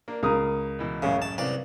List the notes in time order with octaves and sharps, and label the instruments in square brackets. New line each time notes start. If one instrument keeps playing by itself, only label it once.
[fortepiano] A#3 D4
[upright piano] C#2 A#4 D#6 [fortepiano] F5
[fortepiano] B2 E3
[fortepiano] A1 F#2 G#3 [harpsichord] C#3
[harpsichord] A5
C2 G2 D5